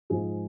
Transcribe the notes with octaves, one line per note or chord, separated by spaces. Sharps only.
G#2 F3 G#3 G#4